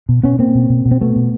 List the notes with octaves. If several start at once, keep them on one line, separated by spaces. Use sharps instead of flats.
B2
B2 B3 C#4
B2 A#3 C4
B2
B2
B2
C4
B2 A3 B3
B2